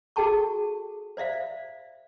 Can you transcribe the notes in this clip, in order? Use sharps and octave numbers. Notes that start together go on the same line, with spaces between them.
F#4 G#4 A4 G5 A5 C#6
C5 D5 E5 F5